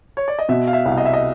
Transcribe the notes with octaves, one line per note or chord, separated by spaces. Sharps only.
C#5
D5
D#5
B2 E5
F5
E5
C2
D#5
E5
D#5